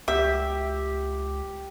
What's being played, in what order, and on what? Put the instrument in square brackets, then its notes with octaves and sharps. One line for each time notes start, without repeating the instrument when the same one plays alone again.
[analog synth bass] C#2 [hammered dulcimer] G4 [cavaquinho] E5